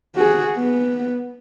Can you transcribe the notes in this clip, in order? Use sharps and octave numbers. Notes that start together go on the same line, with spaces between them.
F#4 G#4
B3